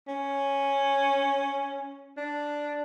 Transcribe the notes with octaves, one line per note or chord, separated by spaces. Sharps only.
C#4
D4